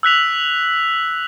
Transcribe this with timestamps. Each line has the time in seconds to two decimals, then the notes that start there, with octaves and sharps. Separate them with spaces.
0.03 E6 F#6 B6 F7